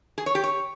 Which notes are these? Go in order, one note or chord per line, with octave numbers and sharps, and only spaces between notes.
G#4
C#5
G4
C#5